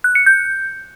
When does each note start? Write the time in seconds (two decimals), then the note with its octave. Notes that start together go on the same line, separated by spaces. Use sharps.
0.04 F#6
0.15 C#7
0.26 G6